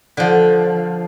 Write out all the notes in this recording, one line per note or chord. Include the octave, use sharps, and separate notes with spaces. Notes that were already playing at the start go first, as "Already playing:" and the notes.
D3 F3